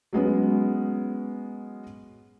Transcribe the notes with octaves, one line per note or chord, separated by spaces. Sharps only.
F#3 G#3 B3 C#4